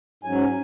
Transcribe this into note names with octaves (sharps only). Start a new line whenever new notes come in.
G#2 F#3 C#4 G#5